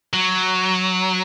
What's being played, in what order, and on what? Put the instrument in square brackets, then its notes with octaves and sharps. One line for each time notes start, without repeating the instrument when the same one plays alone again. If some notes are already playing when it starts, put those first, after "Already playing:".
[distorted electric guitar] F#3